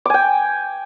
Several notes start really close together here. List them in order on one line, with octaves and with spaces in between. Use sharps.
D6 G#5 G5